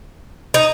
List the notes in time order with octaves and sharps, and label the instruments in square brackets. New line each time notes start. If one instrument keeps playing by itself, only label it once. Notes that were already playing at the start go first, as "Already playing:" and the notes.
[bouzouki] D#4